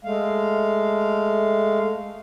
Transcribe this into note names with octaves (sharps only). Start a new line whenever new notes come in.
G#3 A3 F5